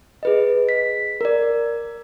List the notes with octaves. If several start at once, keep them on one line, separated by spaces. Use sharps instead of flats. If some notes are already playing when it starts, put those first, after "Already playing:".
G#4 B4 D#5
B6
A#4 D5